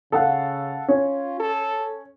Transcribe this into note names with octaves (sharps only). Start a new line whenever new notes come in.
C#3 A4 F5 F#5
C#4 F4
A4